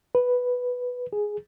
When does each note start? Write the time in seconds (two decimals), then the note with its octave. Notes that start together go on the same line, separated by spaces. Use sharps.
0.15 B4
1.13 G#4